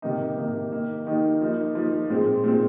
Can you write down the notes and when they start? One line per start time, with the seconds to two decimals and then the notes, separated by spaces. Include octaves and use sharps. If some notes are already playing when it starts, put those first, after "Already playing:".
0.02 C3 D#3 A#3 D#4
0.37 C3 D#3 A#3 D#4
0.72 D#3 A#3 D#4
1.07 D#3 A#3 D#4
1.41 F3 A#3 D#4
1.75 F3 A#3 D#4
2.10 A#2 G#3 C4
2.44 A#2 G#3 C4